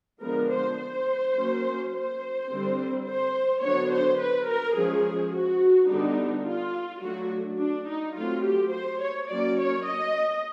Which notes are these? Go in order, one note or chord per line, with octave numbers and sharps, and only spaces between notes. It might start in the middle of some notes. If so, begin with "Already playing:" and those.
D3 F3 G#3 B3 D4 A#4
C5
C5
F#3 A#3 C#4
C5
D3 G3 C4
C5
D3 F#3 B3 D4 C#5
C5
B4
A#4
F3 G#3 C#4 G#4
F#4
D3 G3 B3 D4 D#4
F4
F#3 A3 D4 F#4
D4
D#4
F#3 A3 C4 F4
G4
C5
C#5
F#3 A#3 C#4 D5
C#5
D#5